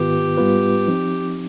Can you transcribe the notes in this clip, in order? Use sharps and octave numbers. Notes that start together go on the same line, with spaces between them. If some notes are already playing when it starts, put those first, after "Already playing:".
Already playing: G#2 D#3 B3 F4 G4 B4
G#2 G3 B3 F4 B4
F3 C4 D#4